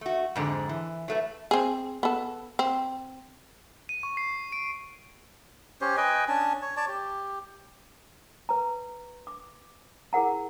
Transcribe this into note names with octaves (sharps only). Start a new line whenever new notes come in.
A3 F#4
F2 G#2 D3
E3
F#3 A3 B4
C4 G#4
B3 A4
C4
D#7
C#6
C7
D7
C#4 G4 C5 C#5
B4 D#5 G5 G#5
C#4 D4 G#5 A5
C#5
C#5 D5 A5
G4
B4 A#5
D6
E4 G#4 A#4 F#5 A#5